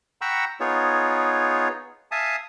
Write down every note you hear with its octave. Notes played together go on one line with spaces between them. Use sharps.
F#5 G5 A#5 B5 C#6 E6
B3 D#4 F4 G#4 C#5
E5 F5 G#5 A5 D#6